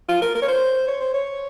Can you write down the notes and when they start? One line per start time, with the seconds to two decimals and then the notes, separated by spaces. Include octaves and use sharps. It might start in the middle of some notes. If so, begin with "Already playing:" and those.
0.08 F4
0.22 A#4
0.35 A#4
0.42 C#5
0.48 C5
0.88 C#5
1.01 C5
1.14 C#5